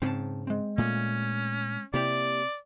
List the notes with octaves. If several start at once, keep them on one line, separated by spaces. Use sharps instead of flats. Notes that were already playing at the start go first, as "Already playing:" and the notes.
G#2 C#3 C4 A5
G#3 C4
A#2 A3 C#4
C3 A#3 E4 G4 D5